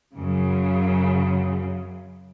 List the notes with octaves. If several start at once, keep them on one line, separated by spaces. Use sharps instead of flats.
F#2 C#3